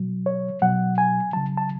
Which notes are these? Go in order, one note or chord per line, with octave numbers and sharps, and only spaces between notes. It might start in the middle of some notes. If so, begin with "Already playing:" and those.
Already playing: B2 F#3
C#5
B2 F#3 F#5
G#5
C#3 F#3 A5
A5